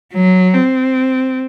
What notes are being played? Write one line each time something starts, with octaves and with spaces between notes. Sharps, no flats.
F#3
C4